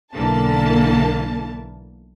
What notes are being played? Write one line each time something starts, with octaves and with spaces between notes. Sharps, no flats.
B1 D3 E3 A#3 A5